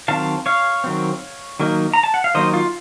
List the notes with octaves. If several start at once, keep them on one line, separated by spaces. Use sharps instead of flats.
D#3 F#3 C4 F5 A5
C#5 F5
D#3 F#3 C4
D#3 F#3 A#3 D#4
A#5
A5
F#5
F5
D#3 F#3 A#3 D#4 C5 D#5
F4